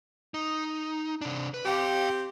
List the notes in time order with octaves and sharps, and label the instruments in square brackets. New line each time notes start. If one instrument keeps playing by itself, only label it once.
[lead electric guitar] D#4
C3 D4
B4
[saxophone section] C4 G4 [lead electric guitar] F5 G5